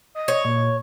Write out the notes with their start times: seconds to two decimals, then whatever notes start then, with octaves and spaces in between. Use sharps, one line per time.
0.15 D#5
0.28 C#5
0.45 A#2